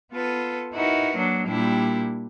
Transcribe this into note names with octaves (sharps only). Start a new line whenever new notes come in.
B3 F4 A4 B4
D#4 E4 F#4 A#4 B4
F#3 A#3 D4
A#2 G3 A#3 D4 E4 G4